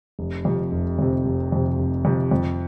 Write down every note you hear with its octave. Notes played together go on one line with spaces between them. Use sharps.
F1
F2 C3
F1
F2 C3
F1
F2 C3
F1
F2 C3
F2